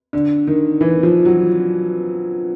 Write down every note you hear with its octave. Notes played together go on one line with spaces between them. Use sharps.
D3
D#3
E3
F3
F#3